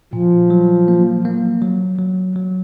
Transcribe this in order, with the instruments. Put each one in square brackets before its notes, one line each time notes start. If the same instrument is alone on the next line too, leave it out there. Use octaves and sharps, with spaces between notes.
[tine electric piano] A#2 [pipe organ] F3
[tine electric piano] F#3
A#3
A#3
F#3
F#3
F#3